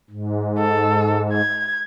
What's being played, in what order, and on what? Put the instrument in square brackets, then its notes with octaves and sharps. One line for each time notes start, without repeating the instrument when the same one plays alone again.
[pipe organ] G#2
[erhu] A4
G#6